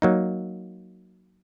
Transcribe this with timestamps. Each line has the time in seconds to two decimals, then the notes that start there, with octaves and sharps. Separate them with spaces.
0.02 F#3 A#3 D#4